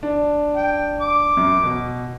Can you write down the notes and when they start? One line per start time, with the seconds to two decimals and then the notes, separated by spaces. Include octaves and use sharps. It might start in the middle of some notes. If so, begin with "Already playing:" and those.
0.03 D4
0.56 G5
1.01 D6
1.37 F#2
1.63 B2